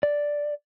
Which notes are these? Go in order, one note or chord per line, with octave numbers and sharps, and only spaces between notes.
D5